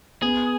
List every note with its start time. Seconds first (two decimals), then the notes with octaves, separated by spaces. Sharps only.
0.22 B3 G#4